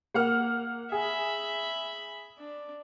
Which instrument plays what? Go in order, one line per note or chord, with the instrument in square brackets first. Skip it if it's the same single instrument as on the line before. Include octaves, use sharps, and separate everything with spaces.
[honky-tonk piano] A#3 F#5 F6
[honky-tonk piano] G#4 [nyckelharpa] E5 B5
[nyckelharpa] D4